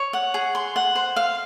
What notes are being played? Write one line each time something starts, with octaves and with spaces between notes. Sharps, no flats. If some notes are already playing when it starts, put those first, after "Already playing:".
Already playing: C#5
F#5
G#4
C6
F#5
C5
F5